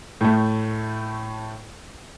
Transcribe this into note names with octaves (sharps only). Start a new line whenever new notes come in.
A2 A3